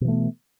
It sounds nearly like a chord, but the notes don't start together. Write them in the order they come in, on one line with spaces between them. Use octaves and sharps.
B2 E3 A3 B3